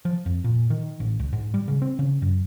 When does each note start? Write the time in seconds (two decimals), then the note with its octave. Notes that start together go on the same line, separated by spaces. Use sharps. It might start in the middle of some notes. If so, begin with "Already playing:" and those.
0.05 F3
0.26 F2
0.44 A#2
0.70 D#3
1.00 A1
1.19 C#2
1.32 G#2
1.54 G3
1.68 C#3
1.82 C4
1.99 C#3
2.22 F#2